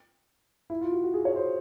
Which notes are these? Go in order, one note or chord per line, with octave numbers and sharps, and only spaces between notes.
E4
F4
F#4
F#4
G#4
C#5
C5